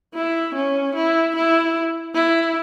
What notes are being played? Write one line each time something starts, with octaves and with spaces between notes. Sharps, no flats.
E4
C#4
E4
E4
E4